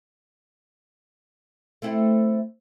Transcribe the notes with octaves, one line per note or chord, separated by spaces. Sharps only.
A3 C4 E4